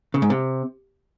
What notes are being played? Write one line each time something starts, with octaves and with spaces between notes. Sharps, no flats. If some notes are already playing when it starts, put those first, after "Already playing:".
C#3
G#2
C3